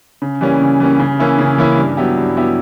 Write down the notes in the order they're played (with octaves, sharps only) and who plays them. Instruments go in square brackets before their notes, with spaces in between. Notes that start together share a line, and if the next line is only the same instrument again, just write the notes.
[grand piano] C#3
E3 G3 A#3 C#4
C#3
E3 G3 A#3 C#4
C#3
E3 A#3 C#4 E4
C#3
E3 A#3 C#4 E4
G2
F#3 B3 E4 G4
G2
F#3 B3 E4 G4